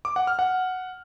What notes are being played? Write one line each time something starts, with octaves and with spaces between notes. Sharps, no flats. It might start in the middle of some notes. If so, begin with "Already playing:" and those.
D6
F#5
F6
F#5